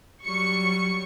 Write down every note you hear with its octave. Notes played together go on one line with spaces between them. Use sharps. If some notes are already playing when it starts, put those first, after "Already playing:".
F#3 G3 C#6 C#7